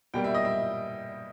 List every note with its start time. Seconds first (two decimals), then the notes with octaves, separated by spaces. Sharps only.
0.14 B2 G3 A#3 G5
0.24 E5
0.34 D#5
0.45 E5